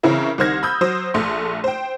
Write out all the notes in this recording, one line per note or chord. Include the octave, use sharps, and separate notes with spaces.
C#3 E3 C4 C#4 E4 A#4
C2 D#3 C5 F6 G#6 A#6
B5 D#6 E6 G6
F#3 C5 D#6
A#1 A3 C6
C5 G5